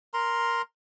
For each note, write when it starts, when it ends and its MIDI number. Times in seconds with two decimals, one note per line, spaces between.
0.14 0.62 70
0.14 0.62 82
0.14 0.62 84